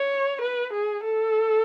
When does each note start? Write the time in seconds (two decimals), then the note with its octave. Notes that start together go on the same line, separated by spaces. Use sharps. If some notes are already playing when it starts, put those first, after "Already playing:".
Already playing: C#5
0.41 B4
0.73 G#4
1.04 A4